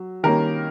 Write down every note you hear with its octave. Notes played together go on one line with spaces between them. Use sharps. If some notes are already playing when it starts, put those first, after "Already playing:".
Already playing: F#3
D#3 G3 A#3 C#4 A#4